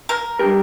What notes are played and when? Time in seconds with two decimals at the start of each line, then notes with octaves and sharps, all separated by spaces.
0.09 A#4
0.39 G3 D4 G4 A#4